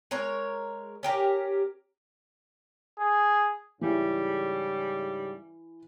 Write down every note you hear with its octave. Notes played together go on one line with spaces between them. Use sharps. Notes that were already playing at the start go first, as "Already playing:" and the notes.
G#3 A#4 C#5
C#4 G4 A#4
G#4
G#2 C#3 E3 G3